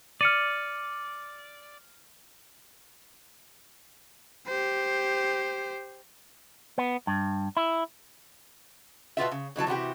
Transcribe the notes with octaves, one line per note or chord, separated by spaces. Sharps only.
D5 F6 C#7 D#7
G4 C5
B3
G2
E4
B2 B3 F4 E5
C#3
B2 E3 F#3 A5
C3 E3 F#4 G4